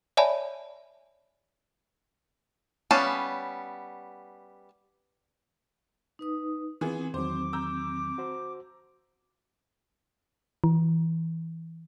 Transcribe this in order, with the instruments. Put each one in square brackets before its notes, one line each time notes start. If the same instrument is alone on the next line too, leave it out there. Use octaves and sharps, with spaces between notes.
[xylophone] C#5 D5 E5 G#5 A5 B5
[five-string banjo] G3 B3 C#4 F5 A5
[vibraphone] D#4 B4 D#6
[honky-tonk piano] E3 B3 G#4 [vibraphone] C4
[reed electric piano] E2 D#3 F#3 [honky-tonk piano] C5 [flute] D6
[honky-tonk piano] A#5 E6 G6
[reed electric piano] F#4 C5
[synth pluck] E3